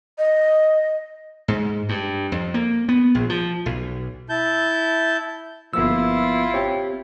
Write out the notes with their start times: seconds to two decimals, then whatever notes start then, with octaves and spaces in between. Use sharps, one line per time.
0.18 D#5
1.48 G#2
1.89 G2
2.32 F2
2.54 A#3
2.89 B3
3.15 A#1
3.30 F3
3.66 B1
4.29 E4 A5 G6
5.73 G1 F3 A#3 B3 E4 F4 E6
6.54 C4 G4 C#5